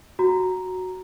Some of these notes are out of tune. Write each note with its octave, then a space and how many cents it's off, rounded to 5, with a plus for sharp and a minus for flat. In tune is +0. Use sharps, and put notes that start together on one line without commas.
F#4 +0 A#5 +0